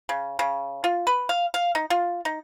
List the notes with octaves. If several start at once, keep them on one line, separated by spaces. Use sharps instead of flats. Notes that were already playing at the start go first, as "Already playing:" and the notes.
C#3
C#3
F4
B4
F5
F5
D#4
F4
D#4